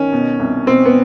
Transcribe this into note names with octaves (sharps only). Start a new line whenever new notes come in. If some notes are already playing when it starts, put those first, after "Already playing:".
Already playing: D#3 C#4
B2
C2
B2 C4
B3